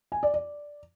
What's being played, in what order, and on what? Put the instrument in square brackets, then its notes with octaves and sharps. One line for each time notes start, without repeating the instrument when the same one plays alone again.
[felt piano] G#5
D5
D5